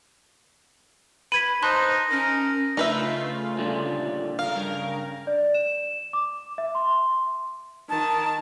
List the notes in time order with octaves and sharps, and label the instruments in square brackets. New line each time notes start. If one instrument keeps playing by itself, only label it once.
[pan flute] B4 [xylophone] B5 G#6 B6 [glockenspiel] D#7
[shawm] D#4 [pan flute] C5 [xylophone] A5 C6 F#6
[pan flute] C#4 [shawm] A#4
[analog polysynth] C#3 A3 F4 [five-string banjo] D#4 B4 E5
[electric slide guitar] A#2 D3 G3
[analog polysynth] C#3 A#4 [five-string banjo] F5
[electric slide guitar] G2
[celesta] D5
E7
D6
E5
C6
[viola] D#3 [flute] A5